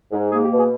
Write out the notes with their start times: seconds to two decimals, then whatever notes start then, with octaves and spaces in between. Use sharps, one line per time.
0.10 G#2
0.30 A#3 G#4
0.43 G4
0.51 B2
0.58 G#4